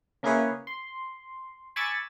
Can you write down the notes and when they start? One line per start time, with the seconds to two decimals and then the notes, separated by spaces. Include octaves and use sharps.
0.23 C#3 A#3 E4 G#4 B4 C#5
0.67 C6
1.76 G#5 B5 C#6 D6 E6 A6